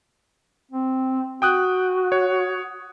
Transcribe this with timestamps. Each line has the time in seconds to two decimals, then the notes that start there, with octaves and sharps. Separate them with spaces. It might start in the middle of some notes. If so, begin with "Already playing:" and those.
0.71 C4
1.42 F#4 G5 D#6 F#6
2.12 C#5